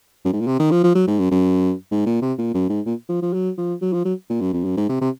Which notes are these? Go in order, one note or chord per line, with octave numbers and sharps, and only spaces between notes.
F#2
G#2
A#2
C3
D#3
F3
F3
F#3
G#2
F#2
F#2
G#2
A#2
C3
A#2
F#2
G#2
A#2
F3
F3
F#3
F3
F#3
F3
F#3
A#2
F#2
F2
F#2
G#2
C3
C3